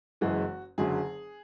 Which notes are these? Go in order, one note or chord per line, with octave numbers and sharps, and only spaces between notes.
F#1 F#2 E3 G#3 F#4
F#1 F#2 D3 F#3 G#4